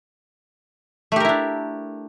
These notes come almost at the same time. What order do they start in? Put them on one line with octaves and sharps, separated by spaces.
A3 G4 A#4 E4 D4